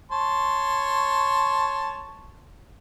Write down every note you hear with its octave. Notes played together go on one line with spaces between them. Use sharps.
C#5 A5 C6